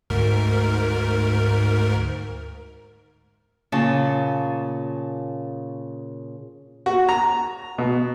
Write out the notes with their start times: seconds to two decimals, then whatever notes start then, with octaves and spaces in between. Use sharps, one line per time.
0.10 D2 G#2 A#4
3.72 A#2 C#3 C#4 A5
6.86 F#4
7.09 A#5
7.78 B2